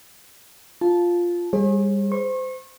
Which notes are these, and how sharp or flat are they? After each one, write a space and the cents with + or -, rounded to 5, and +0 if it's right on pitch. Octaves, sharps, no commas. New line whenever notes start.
F4 +0 A5 -15
G3 +30 G#4 +0 C#5 -45
C5 -25 C#6 -35